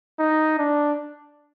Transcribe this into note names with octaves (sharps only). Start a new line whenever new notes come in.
D#4
D4